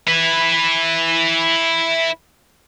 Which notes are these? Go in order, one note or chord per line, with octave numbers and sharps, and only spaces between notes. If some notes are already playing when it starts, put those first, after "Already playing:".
E4 B4